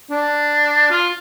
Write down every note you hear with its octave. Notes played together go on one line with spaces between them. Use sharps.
D4
F4